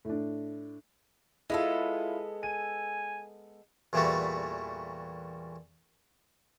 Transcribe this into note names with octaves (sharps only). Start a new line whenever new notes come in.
A2 D4
G#3 B3 E4 F4 A4
G#5 D#7
E2 A#2 E3 G3 A3 F#4